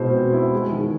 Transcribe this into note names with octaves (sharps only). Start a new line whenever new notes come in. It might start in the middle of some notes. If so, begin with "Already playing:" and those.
Already playing: B2 G#3 E4 C5
C4
E4
G#3
D#3